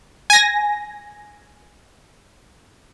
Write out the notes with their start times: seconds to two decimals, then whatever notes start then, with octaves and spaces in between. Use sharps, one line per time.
0.30 G#5 A#6